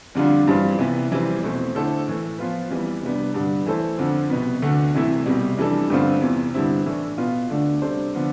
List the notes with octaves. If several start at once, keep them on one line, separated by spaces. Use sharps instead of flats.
F2 D3 G3 D4 F4
G2 E3 G3 C4 F4
C2 C3 E3 B3
F2 E3 G3 C4
E2 B2 A3 C4
D3 A3 E4 A4 C5
A2 E3 A3
F3 B3 F4 B4
F2 E3 G3 B3
C2 C3 G3 B3 D4
G2 D3 G3 D4
E3 A3 E4 A4 C5
F2 D3 F3
C2 B2 B3
D2 D3 A3
C2 C3 E3 A3 E4
C2 B2 G3
F2 E3 G3 D4 A4
G2 D3 A3 C4 F4
E2 C3 E3
G2 D3 G3 C4 E4
A2 E3 A3 D4
B2 B3 F4
D2 D3 A3 D4
C3 G3 D4 A4 C5
D3 F3 B3